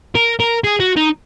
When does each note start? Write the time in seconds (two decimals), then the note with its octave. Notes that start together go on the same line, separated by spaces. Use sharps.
0.15 A#4
0.40 A#4
0.64 G#4
0.80 F#4
0.96 D#4